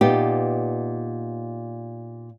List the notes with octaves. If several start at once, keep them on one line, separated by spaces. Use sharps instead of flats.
A#2 B3 D#4 G4